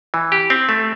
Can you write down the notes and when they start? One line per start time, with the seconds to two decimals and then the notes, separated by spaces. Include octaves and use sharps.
0.14 E3
0.32 G4
0.50 C4
0.69 A3